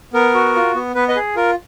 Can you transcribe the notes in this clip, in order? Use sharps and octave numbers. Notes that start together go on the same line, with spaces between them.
B3 A#4
F#4
F4
B3
B3 B4
B4 D#5
G#4
F4 A#4